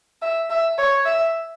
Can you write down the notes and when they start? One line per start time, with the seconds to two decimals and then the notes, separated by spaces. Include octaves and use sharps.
0.22 E5
0.50 E5
0.78 C#5
1.06 E5